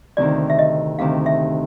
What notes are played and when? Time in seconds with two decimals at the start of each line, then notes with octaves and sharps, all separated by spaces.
0.17 D2 C3 D#3 D5
0.50 E5
0.59 D#5
0.99 D2 C3 D#3 F5
1.26 E5